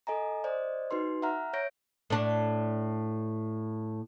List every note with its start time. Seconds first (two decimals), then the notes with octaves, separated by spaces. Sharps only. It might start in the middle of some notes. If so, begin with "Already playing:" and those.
0.07 A4 D#5 G#5 A#5
0.44 C5 D5 D#5
0.91 D#4 F#4 B4 C6
1.22 E5 F#5 A#5 F6
1.53 C#5 E5 G6 A#6 D7
2.10 A2 D4